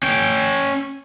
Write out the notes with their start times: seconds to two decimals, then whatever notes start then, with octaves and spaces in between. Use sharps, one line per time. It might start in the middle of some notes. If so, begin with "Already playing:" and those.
0.03 C#4 G5